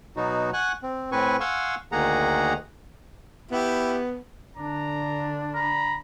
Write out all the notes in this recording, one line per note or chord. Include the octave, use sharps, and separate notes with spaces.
B2 F#3 B3 D#4 F#4
F#5 G#5 C#6 F#6
C4
A2 C4 B4 G#5 C#6
F5 F#5 G#5 C6 C#6 E6
D2 D#3 A#3 G#4 F#5 A#5
B3 E4 G4
D3 D4 A#5
A#5 B5